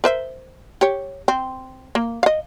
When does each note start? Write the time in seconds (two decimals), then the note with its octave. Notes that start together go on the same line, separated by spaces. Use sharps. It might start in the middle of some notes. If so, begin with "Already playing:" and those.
0.04 A#4 C5 E5
0.81 G4 C#5
1.28 C4
1.95 A#3
2.23 D#5 F5